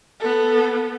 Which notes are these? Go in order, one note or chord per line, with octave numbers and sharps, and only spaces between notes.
B3 A4